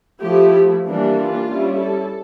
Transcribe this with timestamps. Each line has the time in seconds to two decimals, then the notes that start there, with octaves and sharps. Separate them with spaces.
0.21 F3 A3 E4 G4
0.85 E3 G3 A#3 D4
1.16 F4
1.47 G3 C#4 E4
1.79 A4